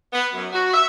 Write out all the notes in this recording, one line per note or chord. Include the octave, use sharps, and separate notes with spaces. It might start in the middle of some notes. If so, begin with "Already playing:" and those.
B3
F#2
F#4
E5